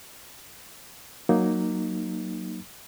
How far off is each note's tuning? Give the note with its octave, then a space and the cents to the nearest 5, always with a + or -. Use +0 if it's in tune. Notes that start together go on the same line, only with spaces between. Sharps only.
F#3 +0 A#3 +0 D#4 -10